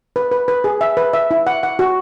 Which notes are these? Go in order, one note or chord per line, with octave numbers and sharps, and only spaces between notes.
B4
B4
B4
G#4
E5
B4
E5
E4
F#5
F#5
F#4